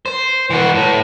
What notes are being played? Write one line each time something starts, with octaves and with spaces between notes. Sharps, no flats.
C5
E3 F#4
A2